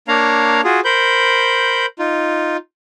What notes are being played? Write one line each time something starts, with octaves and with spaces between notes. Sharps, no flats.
A#3 D4 C#5 F5 A#5
F4 F#4 G#4
A#4 C5 B5 G6
D#4 F4